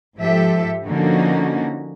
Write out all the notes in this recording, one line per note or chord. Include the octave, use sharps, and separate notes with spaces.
G#2 F3 G4 A4 E5
D3 F3 A#3 C#4 D#4 F#4